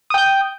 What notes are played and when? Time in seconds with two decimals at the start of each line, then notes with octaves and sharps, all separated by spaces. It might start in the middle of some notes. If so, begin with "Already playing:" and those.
0.10 D#6
0.14 G5
0.18 G6